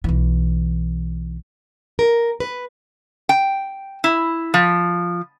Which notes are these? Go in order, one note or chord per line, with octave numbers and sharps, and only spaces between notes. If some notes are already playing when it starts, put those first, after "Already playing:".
B1 E3
A#4
B4
G5
E4
F3